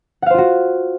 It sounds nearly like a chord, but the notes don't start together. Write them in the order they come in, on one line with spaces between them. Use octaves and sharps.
F#5 F5 C5 F4 F#4